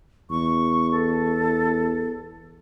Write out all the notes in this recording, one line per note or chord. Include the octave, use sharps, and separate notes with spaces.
E2 C#6
A4